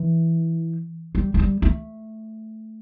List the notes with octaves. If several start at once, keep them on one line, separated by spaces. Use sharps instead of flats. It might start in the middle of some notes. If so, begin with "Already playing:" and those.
Already playing: E3
G3
A3
G3
A3